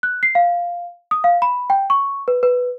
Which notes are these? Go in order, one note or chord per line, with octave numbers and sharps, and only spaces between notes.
F#6
C7
F5
D#6
F5
B5
G5
C#6
B4
B4